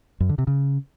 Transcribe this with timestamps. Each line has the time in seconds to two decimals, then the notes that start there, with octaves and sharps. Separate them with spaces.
0.20 F#2
0.29 D3
0.38 C3
0.47 C#3